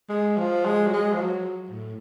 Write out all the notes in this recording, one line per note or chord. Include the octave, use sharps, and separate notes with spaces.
G#3
F3
G#3
F#3
G#3
F3
F#3
A2